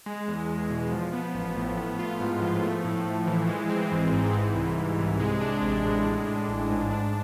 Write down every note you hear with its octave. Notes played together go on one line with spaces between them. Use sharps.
G#3
E2
E2
B2
F3
B3
A1
A2
B3
F4
G#2
F3
A3
A2
A2
E3
G#3
C4
G#1
G#2
E3
C2
C2
C3
G#3
D4
A1
A2
G#3
D4
A1
G#2
D4